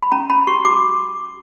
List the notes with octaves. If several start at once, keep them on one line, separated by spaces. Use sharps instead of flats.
B5
C#4 A#5
C#4 B5
F#4 C#6
F#4 D6